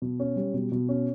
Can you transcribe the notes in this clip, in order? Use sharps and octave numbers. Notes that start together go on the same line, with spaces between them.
B2
C#4
G3
B2
B2
C#4